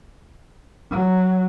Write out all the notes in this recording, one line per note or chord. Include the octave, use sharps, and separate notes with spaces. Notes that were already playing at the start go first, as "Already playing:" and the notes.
F#3